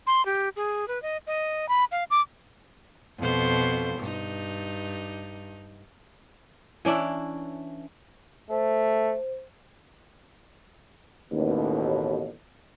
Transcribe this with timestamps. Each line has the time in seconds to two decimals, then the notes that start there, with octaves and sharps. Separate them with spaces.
0.07 C6
0.25 G4
0.56 G#4
0.88 B4
1.02 D#5
1.27 D#5
1.69 B5
1.92 F5
2.10 D6
3.18 F2 B2 C5
3.99 G2 D#4
6.85 E3 C#4 D4 E4
8.51 A3 C5
11.30 A1 D#2 B2